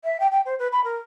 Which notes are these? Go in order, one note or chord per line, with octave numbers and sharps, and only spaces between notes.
E5
G5
G5
C5
B4
B5
A#4